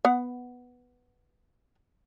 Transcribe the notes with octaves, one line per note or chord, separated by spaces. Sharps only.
B3 F#5